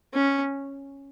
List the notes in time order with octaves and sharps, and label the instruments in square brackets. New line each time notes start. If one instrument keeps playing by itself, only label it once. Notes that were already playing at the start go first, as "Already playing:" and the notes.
[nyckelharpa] C#4